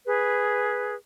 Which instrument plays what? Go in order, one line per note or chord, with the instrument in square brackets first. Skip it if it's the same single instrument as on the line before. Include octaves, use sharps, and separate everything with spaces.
[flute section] G#4 B4